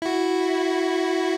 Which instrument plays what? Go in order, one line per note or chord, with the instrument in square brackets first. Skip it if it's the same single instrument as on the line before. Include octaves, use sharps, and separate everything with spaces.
[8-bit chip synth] E4 F#4